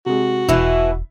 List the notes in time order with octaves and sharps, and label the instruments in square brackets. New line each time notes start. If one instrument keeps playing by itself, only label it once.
[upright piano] C3 G#3 [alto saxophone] F#4
[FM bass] E1 [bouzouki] B2 E3 [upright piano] E4